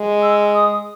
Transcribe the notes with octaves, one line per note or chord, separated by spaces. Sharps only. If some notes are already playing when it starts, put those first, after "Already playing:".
Already playing: G#3
E6
D#6